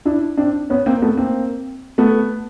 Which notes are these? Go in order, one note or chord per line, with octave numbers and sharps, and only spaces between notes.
D4 E4
C4 D4
B3 C#4
A#3 C4
A3 B3
A#3 C4
A3 B3